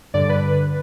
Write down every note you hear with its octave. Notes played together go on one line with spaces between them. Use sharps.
G2 D3 D5
B4